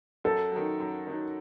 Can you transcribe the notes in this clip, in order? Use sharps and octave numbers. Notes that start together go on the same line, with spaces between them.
F#2 A4
D#3 F#3
F#2
D#3 F#3